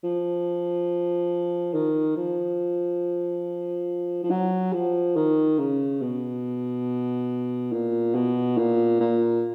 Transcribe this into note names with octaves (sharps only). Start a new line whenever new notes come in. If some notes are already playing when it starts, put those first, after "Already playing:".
F3
D#3
F3
F3
F#3
F3
D#3
C#3
B2
A#2
B2
A#2
A#2